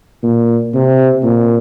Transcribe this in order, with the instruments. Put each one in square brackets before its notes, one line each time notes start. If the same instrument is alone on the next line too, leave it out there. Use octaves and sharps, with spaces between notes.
[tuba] A#2
C3
A#2